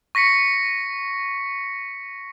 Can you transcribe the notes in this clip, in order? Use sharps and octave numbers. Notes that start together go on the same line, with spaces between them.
C#6 A#6 B6 C#7